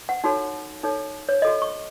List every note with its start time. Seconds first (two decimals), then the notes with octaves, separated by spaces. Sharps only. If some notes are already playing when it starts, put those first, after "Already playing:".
0.09 F#5
0.24 D#4 F#4 A4 C#5
0.83 D#4 A4 C#5
1.29 C#5
1.42 F#4 A4 C#5 D#5
1.62 C#6